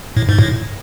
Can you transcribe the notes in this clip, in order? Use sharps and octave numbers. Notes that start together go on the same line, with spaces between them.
A2
G#2
A2